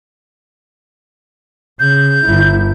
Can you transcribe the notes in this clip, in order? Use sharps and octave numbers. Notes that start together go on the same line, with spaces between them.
C#3 G6
G1 E4